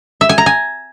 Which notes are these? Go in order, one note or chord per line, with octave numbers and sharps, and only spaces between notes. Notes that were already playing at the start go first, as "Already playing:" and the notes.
E5
G#5
A#5
G#5